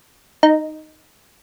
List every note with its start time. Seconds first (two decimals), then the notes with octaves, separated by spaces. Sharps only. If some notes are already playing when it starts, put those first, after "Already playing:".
0.43 D#4